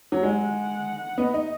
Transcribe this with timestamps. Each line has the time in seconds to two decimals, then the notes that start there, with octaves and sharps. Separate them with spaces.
0.12 F#3
0.23 G#3 F#5
1.18 B3 D#5
1.34 D#4